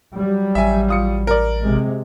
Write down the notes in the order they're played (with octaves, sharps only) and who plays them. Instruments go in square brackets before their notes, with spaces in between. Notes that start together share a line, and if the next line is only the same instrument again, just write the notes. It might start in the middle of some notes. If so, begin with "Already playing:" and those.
[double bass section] F#3 G3
[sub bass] A1 [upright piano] E5 G#5
[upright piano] F4 D#6 C#7
A#4 D5
[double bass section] C3 G#3